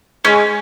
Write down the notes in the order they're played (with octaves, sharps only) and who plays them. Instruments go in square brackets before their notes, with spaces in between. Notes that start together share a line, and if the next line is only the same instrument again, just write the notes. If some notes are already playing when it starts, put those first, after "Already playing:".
[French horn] G#3 [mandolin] C#4